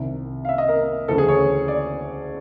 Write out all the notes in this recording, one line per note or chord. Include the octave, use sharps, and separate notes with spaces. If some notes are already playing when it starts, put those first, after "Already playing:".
Already playing: C2 C3 D#3
F5
E5
D#5
A#4
D2 C#3 E3 A4
G#4
C#5
D5